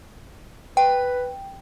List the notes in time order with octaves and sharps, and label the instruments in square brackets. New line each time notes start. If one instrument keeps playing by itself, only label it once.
[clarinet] B4 [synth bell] G5